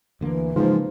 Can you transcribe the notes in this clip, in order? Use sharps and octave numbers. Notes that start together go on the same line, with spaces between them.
D2 D3 E3 A#3
G#2 C#3 F3 A#3